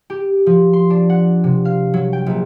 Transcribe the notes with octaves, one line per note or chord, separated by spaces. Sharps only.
G4
F3
C6
D4
F#5
C3
F5
F#3
G5
A#1